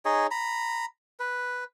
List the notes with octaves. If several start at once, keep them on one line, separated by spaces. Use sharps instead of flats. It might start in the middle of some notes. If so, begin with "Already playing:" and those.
D#4 G#4 C#5 D#5
A#5 B5
B4